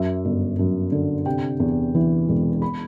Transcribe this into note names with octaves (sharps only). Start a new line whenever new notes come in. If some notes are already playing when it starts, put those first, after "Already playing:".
Already playing: F#2 E5
G1
F#2
D3
C3 G5
E2
E3
E1
B5